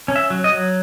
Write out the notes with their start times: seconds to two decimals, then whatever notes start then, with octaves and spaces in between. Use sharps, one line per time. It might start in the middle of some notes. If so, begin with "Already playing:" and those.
0.08 C#4
0.16 E5
0.30 F#3
0.44 D#5
0.52 F#3